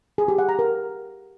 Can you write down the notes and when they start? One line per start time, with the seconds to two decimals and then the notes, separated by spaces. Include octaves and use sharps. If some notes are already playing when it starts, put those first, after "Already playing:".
0.18 G#4
0.28 G4
0.38 F#5
0.49 A#5
0.59 A#4